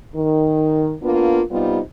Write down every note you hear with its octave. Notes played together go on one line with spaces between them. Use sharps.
D#3
A#3 B3 D4 F4
C3 G3 B3 D#4 F4